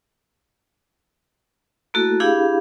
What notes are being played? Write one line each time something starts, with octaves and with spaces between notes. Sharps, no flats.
A3 A#3 E4 F#4 A4
D4 E4 G4 G#4 F5 B5